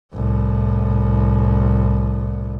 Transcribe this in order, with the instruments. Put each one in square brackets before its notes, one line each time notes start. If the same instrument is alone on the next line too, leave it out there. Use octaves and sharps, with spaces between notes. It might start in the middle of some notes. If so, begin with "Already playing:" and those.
[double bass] C2 A2